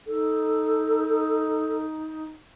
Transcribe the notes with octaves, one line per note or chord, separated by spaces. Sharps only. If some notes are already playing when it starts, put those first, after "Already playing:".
D#4 A4